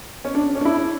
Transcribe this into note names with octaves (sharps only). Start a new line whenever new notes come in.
C#4
D4
C#4
D4
E4